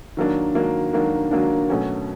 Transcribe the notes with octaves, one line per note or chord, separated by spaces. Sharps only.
D#3 F#3 A#3 D4
D#3 F#3 A#3 D4
D#3 F#3 A#3 D4
D#3 F#3 A#3 D4
B2 F#3 A3 C#4 F#4